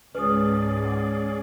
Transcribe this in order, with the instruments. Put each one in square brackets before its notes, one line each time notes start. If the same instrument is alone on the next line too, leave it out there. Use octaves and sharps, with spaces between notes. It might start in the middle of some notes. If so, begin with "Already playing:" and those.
[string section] C#2 G#2 [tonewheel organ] C#4 G#4 D5 [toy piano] B4 D#6
[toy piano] F#5 D6